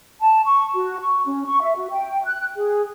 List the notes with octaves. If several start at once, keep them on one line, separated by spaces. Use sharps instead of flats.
A5
C#6
F#4
C#6
C#4
C#6
E5
F#4
G5
F#6
G#4